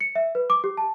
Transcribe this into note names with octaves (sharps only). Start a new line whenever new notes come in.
C#7
E5
B4
D6
G4
A5